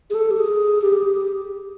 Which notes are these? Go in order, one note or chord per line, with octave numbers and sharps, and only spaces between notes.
G#4
A4
G4
G#4
G4
G#4
G4